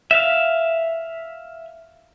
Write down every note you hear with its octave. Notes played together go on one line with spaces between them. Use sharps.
E5 F5